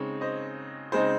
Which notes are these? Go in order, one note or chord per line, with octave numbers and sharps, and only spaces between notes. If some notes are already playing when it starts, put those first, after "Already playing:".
Already playing: C#3 G#3 C4 D#4 C#5
C5 D#5
C#3 G#3 C4 D#4 C5